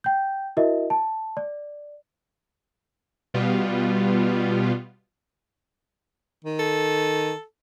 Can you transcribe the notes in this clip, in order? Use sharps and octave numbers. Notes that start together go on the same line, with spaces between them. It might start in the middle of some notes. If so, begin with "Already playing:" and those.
G5 G6
E4 F#4 A#4 D#5 E5
A5
D5
B2 G3 B3 F4
D#3
A4